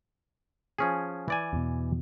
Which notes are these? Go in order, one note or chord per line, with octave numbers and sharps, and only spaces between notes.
F3 C#4 G#4
E3 D5 G#5
E2 B2